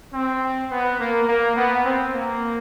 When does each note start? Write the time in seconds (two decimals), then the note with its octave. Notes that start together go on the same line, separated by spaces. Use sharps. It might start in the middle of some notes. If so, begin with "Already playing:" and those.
0.13 C4
0.70 B3
0.99 A#3
1.27 A#3
1.56 B3
1.84 C4
2.13 A#3